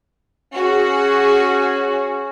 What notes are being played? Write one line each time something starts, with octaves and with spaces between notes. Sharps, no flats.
C#4 F#4 G#4